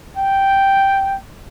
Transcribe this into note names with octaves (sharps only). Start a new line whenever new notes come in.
G5